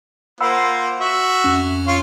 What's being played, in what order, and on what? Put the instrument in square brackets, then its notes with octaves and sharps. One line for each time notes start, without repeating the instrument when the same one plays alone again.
[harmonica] A#3 F4 C5 [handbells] F#5 B5 E6
[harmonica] F#4 E5
[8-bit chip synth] F2 C#4
[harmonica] F4 C#5